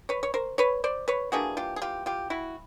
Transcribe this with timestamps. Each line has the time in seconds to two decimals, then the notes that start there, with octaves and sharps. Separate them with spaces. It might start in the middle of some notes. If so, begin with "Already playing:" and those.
0.09 B4 C#5
0.23 C#5
0.34 A#4 C5
0.58 B4 C#5
0.84 C5 D5
1.08 B4 C#5
1.32 E3 G3 A#3 D4 F#4 G#4
1.57 F4 G4
1.76 G#4
1.82 F4 G4
2.06 F4 G4
2.30 E4 F#4